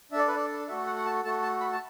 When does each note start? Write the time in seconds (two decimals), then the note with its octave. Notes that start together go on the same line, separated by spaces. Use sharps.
0.12 D4 E5
0.16 A4 D5
0.28 B4
0.36 D5
0.68 A3 F#4 A4 E5
0.86 F#5
0.96 F#5
1.05 A5
1.24 A3 F#4 A4 A5
1.42 A5
1.61 B5
1.72 A5